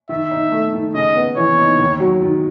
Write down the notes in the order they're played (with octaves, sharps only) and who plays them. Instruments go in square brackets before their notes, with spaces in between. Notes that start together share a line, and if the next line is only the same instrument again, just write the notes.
[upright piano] D#3 [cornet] E5
[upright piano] D#4
A3
D#3
[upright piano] C#3 [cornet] D#5
[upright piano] B3
[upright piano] E3 [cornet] C#5
[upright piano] D#4
D#2
F#3
D#3